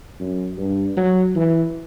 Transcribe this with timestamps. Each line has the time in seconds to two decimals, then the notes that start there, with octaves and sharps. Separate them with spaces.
0.20 F#2
0.58 G2
0.97 F#3
1.36 E3